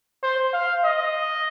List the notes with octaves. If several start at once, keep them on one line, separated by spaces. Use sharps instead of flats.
C5
F5
D#5